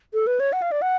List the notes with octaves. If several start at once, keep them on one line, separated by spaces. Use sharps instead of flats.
A4
B4
C#5
F#5
F5
D5
F#5